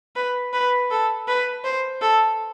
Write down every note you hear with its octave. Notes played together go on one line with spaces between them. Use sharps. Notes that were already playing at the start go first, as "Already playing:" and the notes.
B4
B4
A4
B4
C5
A4